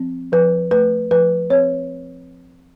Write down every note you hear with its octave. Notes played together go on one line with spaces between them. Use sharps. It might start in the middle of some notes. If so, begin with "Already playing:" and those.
Already playing: F3 C4
F3 B4
A3 B4
F3 B4
C4 C#5